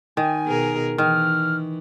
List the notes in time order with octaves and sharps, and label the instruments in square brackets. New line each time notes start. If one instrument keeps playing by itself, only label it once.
[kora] D#3 [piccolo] G#5
[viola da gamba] B2 G#4 A#4
[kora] D#3 [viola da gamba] E3 [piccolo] F6